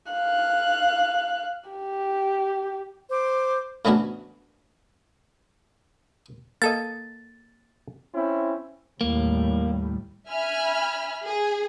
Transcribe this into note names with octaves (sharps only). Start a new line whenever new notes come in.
F5 F#6
G4
C5 D6
A2 E3 B3 C#4 D4 F#4
A#3 A4 D#5 A6
C4 C#4 E4
D#2 A2 G3 A#3
E5 G#5 B5 F6
G#4